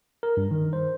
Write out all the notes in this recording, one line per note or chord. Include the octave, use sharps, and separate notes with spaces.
A#4
G2
D#3
C5